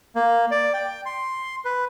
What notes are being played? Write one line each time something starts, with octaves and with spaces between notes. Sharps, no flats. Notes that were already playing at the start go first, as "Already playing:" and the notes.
A#3
D5
G5
C6
B4